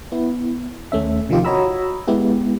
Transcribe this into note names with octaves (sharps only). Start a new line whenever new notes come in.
B3 E4
D#2 A3 C#4 E5
C3 D#3 F3 D#4 F4 G4
F#4 C#5 D#5 A#5 B5 E6
G#3 B3 E4 G4